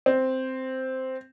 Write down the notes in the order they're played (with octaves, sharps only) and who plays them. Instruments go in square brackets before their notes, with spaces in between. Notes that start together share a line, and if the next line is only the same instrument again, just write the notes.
[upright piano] C4